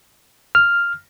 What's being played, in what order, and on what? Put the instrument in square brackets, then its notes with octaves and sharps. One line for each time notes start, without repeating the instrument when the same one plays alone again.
[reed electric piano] F6